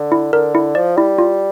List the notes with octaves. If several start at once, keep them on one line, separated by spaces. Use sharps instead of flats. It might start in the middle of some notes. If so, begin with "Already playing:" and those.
Already playing: D3
E4
D3 A#4
E4
F3 D5
G3 E4
F4